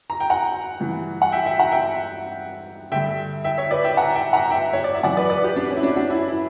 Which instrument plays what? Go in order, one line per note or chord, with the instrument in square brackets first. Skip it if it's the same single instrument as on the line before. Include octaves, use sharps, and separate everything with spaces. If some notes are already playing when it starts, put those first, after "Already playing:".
[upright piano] A#5
G5
F#5 A#5
G2 E3
F#5
E5 G5
E5 G5
F#5 A#5
E5 G5
G2 D3 E5 G5
E5 G5
C#5 E5
B4 D5
E5 G5
F#5 A#5
E5 G5
F#5 A#5
E5 G5
C#5
D5
E5
F#2 E3 D5 F#5
B4 D5
B4 D5
G4 B4
D4
C#4
E4
D4
D4 F#4
C#4 E4
E4